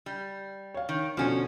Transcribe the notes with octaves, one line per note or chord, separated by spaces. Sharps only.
G3
C#5 F5
D#3
B2 D3 F3 C#4